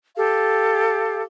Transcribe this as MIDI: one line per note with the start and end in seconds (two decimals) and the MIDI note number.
0.14 1.22 67
0.14 1.22 69
0.14 1.22 77